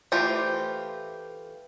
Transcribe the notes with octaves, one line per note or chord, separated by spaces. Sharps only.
E3 A3 F4 G4 C5